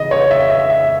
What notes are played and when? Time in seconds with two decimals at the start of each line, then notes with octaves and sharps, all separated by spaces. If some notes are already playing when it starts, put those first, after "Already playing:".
Already playing: C#3 E3 D#5
0.11 C#5
0.31 E5
0.50 E5
0.70 E5